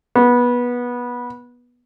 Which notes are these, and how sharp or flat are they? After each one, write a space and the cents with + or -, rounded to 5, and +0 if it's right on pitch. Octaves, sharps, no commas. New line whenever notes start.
B3 -20